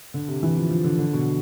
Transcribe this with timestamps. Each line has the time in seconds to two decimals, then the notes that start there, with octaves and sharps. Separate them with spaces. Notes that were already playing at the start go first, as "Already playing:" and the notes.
0.14 D3
0.28 C3
0.43 E3
0.57 F3
0.71 F3
0.84 D3
0.99 D3
1.13 B2